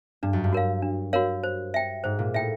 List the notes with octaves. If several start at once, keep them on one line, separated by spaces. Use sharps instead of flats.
G2 D4
F#2
G2
F#4 A#4 C#5 F5
D4
F#4 A#4 C#5 F5
C5
E5 G5
G#2 C5
A#2
A2 E5 G5